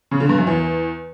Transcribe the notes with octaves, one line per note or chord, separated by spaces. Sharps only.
C#3
D3
G2
F#2
E2